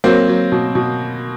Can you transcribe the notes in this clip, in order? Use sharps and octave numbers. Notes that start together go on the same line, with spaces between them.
F#3 A#3 C4
F#3
B2
B2